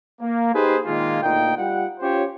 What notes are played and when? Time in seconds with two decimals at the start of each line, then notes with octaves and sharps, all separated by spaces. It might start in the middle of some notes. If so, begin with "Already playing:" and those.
0.20 A#3
0.53 D#4 G4 G#4 B4 C5
0.85 A#2 D#3 G#3 A#3 F4
1.22 D2 A#2 D#4 G5
1.57 G3 F4 F#5
2.00 C#4 F4 G4 C5 C#5